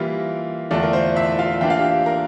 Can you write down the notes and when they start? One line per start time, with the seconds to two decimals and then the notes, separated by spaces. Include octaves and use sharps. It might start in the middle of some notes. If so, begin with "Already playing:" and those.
Already playing: E3 G3 A#3 F4 A#4
0.71 E2 D3 A3 D4 F4 D5
0.83 A#4
0.93 C5
1.16 E4 E5
1.39 F4 F5
1.61 E3 A#3 D4 F4 G5
1.70 F5
1.79 G4 G5
2.06 A#4 A#5